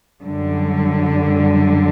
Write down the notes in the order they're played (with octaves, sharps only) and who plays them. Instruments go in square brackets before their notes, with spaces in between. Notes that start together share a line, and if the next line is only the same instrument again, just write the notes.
[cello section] F#2 D3 G3